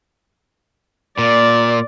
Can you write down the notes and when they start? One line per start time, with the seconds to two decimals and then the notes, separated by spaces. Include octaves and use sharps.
1.18 A#2 D5